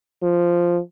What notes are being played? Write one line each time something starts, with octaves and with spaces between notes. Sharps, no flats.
F3